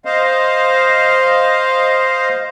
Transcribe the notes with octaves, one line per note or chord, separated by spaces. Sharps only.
C5 D#5 F5